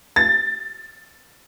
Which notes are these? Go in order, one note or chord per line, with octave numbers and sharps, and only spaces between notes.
A6